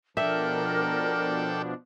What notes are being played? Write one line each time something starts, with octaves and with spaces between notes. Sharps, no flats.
B2 F3 D4 A4 A#4 D5 E5 G5